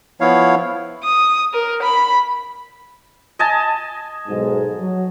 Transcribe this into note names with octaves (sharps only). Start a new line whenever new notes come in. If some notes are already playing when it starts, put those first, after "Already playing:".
F3 B3 E4 C#5 F5
D#6
A#4
B5
D#5 G#5 A5
B1 G#2
F#3